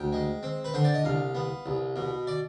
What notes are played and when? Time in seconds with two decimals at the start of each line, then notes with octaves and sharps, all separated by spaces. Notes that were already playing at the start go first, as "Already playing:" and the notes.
Already playing: D2 G5
0.13 G#3
0.43 C4
0.64 B4
0.74 D3 C5
0.84 D5
0.94 D#5
1.04 C2 F5
1.35 B3
1.66 C2
1.96 B2
2.27 D5